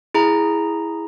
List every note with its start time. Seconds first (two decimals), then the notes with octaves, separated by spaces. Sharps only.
0.14 E4 G#4 A#5